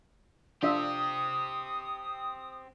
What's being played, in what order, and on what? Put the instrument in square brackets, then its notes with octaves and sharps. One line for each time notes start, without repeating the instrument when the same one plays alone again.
[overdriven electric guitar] C4 G4 [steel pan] D4 F4 E5 [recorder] D#6